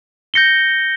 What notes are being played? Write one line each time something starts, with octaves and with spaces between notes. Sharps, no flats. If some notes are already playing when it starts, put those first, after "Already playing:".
G6 A#6 C#7 G7